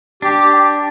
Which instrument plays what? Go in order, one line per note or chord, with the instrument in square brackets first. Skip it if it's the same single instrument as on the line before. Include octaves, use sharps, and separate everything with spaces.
[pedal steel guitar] D4 [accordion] G4